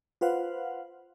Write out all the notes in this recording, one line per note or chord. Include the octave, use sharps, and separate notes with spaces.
F4 B4 C5 F5 F#5